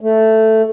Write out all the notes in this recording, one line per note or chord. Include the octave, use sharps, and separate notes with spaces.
A3